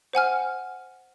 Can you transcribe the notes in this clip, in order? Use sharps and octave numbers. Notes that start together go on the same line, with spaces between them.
C5 F#5 G#5 F6